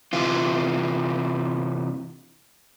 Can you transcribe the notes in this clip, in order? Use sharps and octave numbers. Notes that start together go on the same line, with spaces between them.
C3 E3 F4